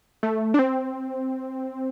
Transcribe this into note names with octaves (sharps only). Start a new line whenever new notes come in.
A3
D4
C4